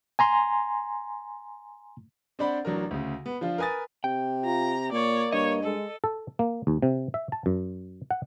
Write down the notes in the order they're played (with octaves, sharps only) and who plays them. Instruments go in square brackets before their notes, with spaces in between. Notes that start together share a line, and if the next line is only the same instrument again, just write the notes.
[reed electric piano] G#5 A#5 C6
[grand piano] C4 D4 C5 D5 F#5 B5
A1 F#3 D4 A#4
D2 C#3
B3
F3 D4 F4
A#4 B4 G#5 D#6 A6
[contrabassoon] C3 [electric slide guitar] G5
[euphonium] F4 [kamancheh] A#5
[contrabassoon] A#2 [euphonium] A#3 [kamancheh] C#5 D5
[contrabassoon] G2 [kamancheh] C#5 [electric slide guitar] D#5
[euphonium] G#3 [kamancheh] A4
[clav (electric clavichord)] A4
A#3
D#2
C3
E5
A5
F#2
F#5